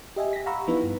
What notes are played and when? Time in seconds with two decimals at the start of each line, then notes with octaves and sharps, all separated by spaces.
0.16 G4 D#5 E5 G#5
0.33 A#6 B6
0.46 F5 F#5 A#5 B5 C#6 E6
0.67 F3 B3 D#4 E4 B4
0.83 G2